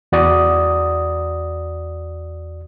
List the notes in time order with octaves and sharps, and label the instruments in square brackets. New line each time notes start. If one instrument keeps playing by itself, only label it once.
[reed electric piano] E2 F#4 D5 D#6